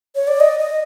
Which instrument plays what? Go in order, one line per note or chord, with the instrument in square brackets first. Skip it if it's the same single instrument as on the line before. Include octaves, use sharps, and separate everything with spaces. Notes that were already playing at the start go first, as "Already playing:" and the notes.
[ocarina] C#5
D5
D#5
D#5